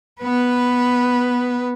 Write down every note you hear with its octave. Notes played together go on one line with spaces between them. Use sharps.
B3 B4